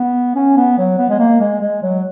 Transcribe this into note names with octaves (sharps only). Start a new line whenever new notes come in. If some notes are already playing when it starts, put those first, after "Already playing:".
Already playing: B3
C#4
B3
F#3
B3
G#3
A#3
G#3
G#3
F#3